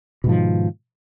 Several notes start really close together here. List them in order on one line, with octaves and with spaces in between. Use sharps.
B2 G#2 F3 D#3